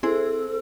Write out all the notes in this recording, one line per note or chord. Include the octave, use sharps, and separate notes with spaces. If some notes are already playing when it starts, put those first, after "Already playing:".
C4 E4 G#4 A4 C5